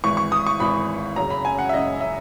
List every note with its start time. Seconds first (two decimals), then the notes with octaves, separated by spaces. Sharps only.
0.04 G#1 G#2 E3 C#6
0.17 C#6
0.32 D#6
0.47 C#6
0.60 G#1 G#2 E3 B5
1.16 F#1 F#2 C#3 A#5
1.30 B5
1.45 G#5
1.58 F#5
1.69 E5
1.73 F#1 F#2 C#3 D#5
2.01 E5